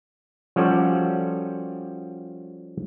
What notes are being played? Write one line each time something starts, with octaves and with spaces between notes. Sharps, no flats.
F3 G3 C#4 F#4 A4 D5